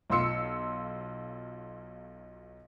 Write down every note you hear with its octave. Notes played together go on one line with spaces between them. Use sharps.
B1 F4 C6 E6 C#7